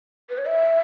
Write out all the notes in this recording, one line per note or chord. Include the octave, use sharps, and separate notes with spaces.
B4
C#5
E5